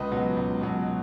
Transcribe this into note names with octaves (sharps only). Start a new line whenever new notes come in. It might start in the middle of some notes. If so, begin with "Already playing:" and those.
Already playing: C#2 B4 D#5
B2 F#3
C#2
B2 F#3